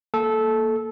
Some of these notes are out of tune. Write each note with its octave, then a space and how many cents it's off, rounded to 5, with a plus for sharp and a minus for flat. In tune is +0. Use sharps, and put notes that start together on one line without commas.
A#3 -5 A4 -15